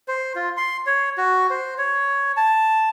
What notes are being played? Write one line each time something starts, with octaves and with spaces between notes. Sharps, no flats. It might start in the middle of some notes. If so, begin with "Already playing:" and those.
C5
F4
C6
C#5
F#4
C5
C#5
A5